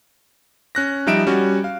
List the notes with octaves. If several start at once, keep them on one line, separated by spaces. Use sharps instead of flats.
C#4 F#6 A#6
F3 G3 D#4 E5 D7 E7
G3 C#4 F#4
F5